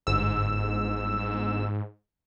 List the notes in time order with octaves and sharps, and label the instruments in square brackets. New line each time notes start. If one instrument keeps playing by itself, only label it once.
[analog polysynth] G1 E6 [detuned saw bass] G#2